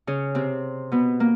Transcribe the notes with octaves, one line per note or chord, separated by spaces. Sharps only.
C#3 C#4
C3 C4
B2 B3
A#3